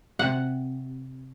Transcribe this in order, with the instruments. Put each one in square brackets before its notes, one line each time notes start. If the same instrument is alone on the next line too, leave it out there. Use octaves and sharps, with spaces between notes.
[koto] C3 F#5